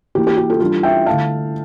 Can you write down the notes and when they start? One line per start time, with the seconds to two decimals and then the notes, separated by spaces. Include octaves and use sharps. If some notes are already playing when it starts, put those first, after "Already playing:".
0.15 E3 A#3 E4 G4
0.27 G4
0.37 G4
0.50 F4 A4
0.60 E3 G3 D4 F4 A4
0.83 E5 G5
1.06 D3 A3 E4 F5 A5